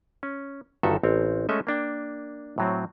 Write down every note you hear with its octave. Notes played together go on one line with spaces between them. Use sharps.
C#4
G1 G2 D#3 F#4 A4 E5
A1 C4 C#5
G#3 A3 C#4 A4 D#5 E5
A#3 D4 G5
A2 F#3 C4